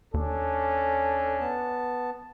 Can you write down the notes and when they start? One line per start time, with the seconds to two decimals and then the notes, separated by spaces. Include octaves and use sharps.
0.14 D#2 C#4 D4 A4
1.40 B3 A5